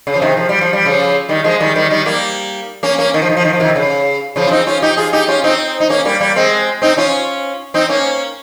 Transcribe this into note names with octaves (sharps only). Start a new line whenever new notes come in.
C#3
F3
C3 D#3
F3
G3
F3
G3
C#3 F3
D#3 G3
F3 G#3
D#3 G3
D#3 G3
D#3 G3
G3 A#3
A#3 C#4
A#3 C#4
D#3
F3
D#3
F3
D#3
F3
C3 D#3
C#3
C#3 F3
F4
C4 D#4
C#4 F4
D#4 G4
F4 G#4
D#4 G4
C#4 F4
C4 D#4
D#4
A#3 C#4
G3 A#3
G3 A#3
G#3 C4
C4 D#4
C#4 F4
C4 D#4
A#3 C#4